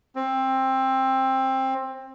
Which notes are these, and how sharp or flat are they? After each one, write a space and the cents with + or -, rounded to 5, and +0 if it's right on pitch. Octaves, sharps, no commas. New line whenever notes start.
C4 +15